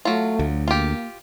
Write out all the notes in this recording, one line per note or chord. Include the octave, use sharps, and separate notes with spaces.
F#3 A3 F4
D2
A#3 F4 G4